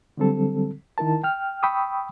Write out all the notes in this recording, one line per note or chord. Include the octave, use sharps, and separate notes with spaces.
D3 F#3 G3 C4 A4
D#3 E4 A#4 A5
G5 F6
G5 B5 C#6 D#6 E6